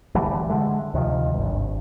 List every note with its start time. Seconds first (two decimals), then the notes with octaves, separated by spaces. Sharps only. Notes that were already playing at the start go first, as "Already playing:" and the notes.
0.15 D3 E3 G3 A3
0.50 D3 G#3 A3
0.94 D2 C3 D#3 F3
1.34 G#1 G2